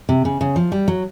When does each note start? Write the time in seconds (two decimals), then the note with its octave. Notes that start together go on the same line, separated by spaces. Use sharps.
0.09 C3
0.25 C#3
0.41 C#3
0.56 F3
0.72 G3
0.88 F#3